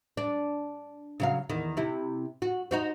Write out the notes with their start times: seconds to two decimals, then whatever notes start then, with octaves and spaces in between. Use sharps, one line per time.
0.17 D4
1.20 C#3 F#3 F5
1.49 E2 D#3
1.77 C3 E4
2.42 F#4
2.71 D#4 F#4 C5